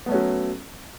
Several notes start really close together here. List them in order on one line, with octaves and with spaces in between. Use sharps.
B3 A3 C#4 F#3